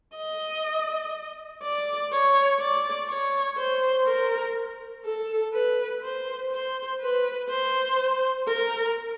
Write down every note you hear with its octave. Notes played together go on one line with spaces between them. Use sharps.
D#5
D5
C#5
D5
C#5
C5
A#4
A4
B4
C5
C5
B4
C5
A#4